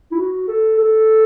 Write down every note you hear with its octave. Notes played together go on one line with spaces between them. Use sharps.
E4
F#4
A4
A4